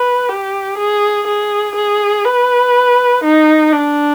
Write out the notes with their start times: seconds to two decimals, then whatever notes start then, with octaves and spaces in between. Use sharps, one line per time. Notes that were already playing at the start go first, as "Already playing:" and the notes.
Already playing: B4
0.29 G4
0.78 G#4
1.27 G#4
1.76 G#4
2.25 B4
3.24 D#4
3.73 D4